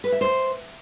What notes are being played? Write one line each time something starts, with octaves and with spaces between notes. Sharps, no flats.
B4
E5
C5